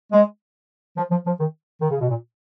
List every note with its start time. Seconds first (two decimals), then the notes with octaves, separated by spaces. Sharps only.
0.13 G#3
0.97 F3
1.11 F3
1.26 F3
1.40 D#3
1.81 D#3
1.91 C#3
2.01 B2
2.09 A#2